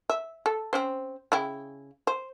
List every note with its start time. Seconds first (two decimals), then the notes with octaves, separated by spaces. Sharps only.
0.10 E5
0.46 A4
0.73 C4 C#4 C5
1.32 C#3 E4 G5
2.07 C5